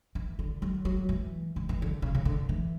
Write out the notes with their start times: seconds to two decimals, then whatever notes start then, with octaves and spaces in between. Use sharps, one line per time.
0.15 E3
0.39 D3
0.62 F#3
0.85 F#3
1.09 E3
1.56 D3
1.69 E3
1.82 D3
2.02 C#3
2.15 C#3
2.25 D3
2.49 E3